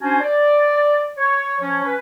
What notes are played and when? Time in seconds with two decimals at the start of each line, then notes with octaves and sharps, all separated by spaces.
0.01 C#4 D4 F#4 C5 G#5
0.20 D5
1.18 C#5
1.61 F3 C#4 C#5
1.84 C#4 B4